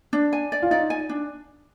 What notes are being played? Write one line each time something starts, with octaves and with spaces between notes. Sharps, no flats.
D4
G#5
D5
F4
D#4 D5
G#5
D4